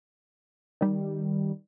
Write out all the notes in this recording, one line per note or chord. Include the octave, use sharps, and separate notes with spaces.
D#3 G3